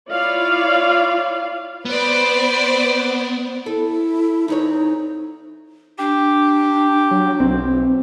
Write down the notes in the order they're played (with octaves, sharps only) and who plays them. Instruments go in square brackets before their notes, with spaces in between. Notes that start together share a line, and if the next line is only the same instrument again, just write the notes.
[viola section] E4 F4 C#5 D5 F5
[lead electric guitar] B3 [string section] B4 C5 D5
[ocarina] E4 [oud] A4
[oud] E2 C4 C#5 [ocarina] D#4
[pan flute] D4 [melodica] G4
[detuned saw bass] F#3
[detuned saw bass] B1 [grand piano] C4